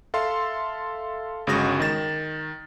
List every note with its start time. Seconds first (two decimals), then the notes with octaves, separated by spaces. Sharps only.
0.14 A4 E5 F5 C6
1.47 G1 C#3 G#3 F#4 D#6 A#6
1.80 D#3 A6 E7